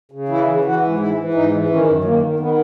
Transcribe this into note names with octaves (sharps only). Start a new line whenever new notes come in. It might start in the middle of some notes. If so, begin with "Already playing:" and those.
C#3
E3 E4
E3
E3 F#4
G#2
E3 E4
E3
G#2 D#4
E3
D#3 C#4
F#2
D#3 A#3
D#3
D#3 B3